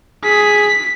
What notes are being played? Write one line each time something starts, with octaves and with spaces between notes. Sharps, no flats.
G#4 B6